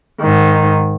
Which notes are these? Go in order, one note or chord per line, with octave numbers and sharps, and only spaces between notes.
G#2 D#3